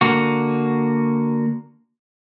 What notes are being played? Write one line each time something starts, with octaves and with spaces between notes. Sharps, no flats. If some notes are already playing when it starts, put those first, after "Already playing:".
D3 A#3 F#4